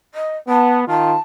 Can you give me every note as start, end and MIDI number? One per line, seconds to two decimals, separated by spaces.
0.14 0.37 75
0.49 0.85 59
0.49 0.80 81
0.88 1.16 51
0.88 1.16 65
0.88 1.20 81